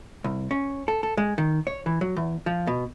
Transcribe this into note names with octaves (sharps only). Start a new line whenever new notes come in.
C2
C#4
A4
A4
G#3
D#3
C#5
E3
F#3
E2
F3
B2